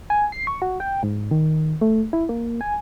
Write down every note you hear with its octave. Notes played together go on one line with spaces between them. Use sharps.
G#5
C7
C#6
F#4
G5
G#2
D#3
A3
E4
A#3
G#5